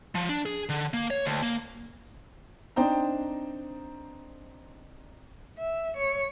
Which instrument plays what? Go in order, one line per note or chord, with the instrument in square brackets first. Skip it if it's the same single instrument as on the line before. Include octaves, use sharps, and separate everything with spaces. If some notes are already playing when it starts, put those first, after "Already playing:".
[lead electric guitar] F3
D4
G#4
D3
A#3
C#5
D2
A#3
[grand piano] C4 D4 D#4 C5 G5 A#5
[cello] E5
C#5